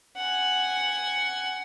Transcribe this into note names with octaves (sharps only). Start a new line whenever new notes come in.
F#5 G#5